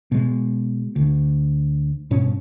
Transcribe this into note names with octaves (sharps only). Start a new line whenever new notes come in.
B2 G#3
D2
G2 B2 C#4